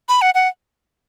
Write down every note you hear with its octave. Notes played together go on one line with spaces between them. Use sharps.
B5
F#5
F#5